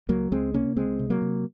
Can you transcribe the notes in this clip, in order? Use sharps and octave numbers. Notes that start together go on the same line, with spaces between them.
C#2 F#3 A#3
C#2 G#3 C4
C3 A#3 C#4
C#2 G#3 C4
C3
F#3 A#3
C3